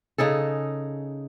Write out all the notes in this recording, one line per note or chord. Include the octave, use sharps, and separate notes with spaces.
C#3 D#4 G#4 A4